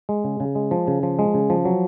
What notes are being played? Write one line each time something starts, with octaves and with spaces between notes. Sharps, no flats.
G#3
C#3
C#3
G#3
F3
C#3
F3
G#3
C#3
F3
F#3